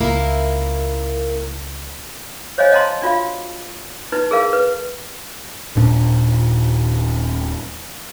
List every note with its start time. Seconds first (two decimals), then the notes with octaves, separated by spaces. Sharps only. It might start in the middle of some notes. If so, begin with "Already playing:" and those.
0.01 C#2 A#3 E4 A#4
2.58 C5 C#5 D#5 F5 G#5
2.72 D#5 F5 F#5 A5 A#5 C6
3.02 D4 F4 F#4 F5
4.12 D#4 E4 B4
4.31 G#4 A#4 F5
4.53 B4
5.76 D#1 A#2 D4